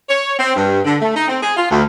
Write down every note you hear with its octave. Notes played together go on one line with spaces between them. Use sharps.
C#5
C4
G2
D3
A3
D#4
C4
G#4
F4
D2